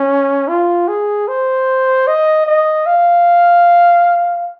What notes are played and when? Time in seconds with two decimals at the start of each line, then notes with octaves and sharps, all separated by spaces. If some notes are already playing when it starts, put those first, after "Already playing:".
Already playing: C#4
0.48 F4
0.88 G#4
1.28 C5
2.07 D#5
2.47 D#5
2.86 F5